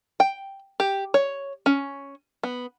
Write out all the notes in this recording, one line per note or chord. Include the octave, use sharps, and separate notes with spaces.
G5
G4
C#5
C#4
B3